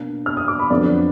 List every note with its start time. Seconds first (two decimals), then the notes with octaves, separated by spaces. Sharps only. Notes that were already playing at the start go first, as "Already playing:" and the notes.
Already playing: B2 A#3 D4
0.26 F6
0.37 D#6
0.48 D6
0.59 B5
0.70 F2 D3 F#3 B3 D4 D5